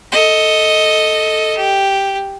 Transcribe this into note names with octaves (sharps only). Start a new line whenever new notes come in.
A4 D#5
G4